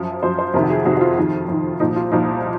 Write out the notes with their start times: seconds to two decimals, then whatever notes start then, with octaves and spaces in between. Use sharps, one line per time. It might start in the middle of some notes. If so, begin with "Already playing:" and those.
Already playing: F#2 F3
0.23 F#2 F3 C5
0.39 C5
0.54 F2 C3 D#3 A#4
0.64 F#4
0.70 G#4
0.85 F2 C3 D#3 F#4
0.97 F#4
1.01 F4
1.18 F2 D#3
1.48 F2 D#3
1.80 C2 A#2 F3 D#4
1.96 F4
2.12 C2 A#2 F3 D#4